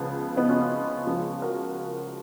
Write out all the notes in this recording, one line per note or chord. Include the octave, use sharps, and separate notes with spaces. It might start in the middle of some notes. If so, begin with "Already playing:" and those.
Already playing: C#2 C#3 F3 B3
B3 D#4
C#4 F4
C#4 F4
C#2 C#3 F3
F#4 A#4